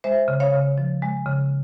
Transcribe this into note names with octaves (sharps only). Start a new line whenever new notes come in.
G#3 C5 E5
C#3
C#5 F5
C#3
F3
G#3
C#3